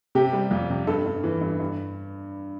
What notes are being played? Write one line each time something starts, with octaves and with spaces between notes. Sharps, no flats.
C3 G4
G3
F2
C3
G2 A4
G2
E3
G2
G2